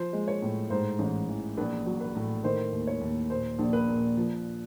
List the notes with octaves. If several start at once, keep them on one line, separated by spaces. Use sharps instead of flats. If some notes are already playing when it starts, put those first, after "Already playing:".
Already playing: F3 C5
G#3
C#5
A2
G#2 C5
A1
E3
A#1 B4
F#3
B4
A2
D#3 C5
D#2
C#5
D#2
A#2 C5
A#1
B4
A#2
F3